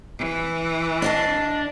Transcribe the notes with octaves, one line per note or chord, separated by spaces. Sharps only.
E3
D4 D#5 F5 A5